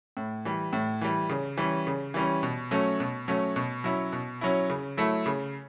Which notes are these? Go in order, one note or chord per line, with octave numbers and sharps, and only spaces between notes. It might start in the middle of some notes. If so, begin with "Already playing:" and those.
A2
E3 G3
A2
E3 G3
C#3
E3 G3 C#4
C#3
E3 G3 C#4
B2
F#3 A3 C#4
B2
F#3 A3 C#4
B2
F#3 C#4 E4
B2
F#3 C#4 E4
C#3
F#3 A3 E4
C#3